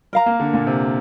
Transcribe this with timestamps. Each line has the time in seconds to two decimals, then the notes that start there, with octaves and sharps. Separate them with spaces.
0.13 A#4 F5 A#5
0.26 A#3
0.40 D3
0.54 A#2
0.67 C3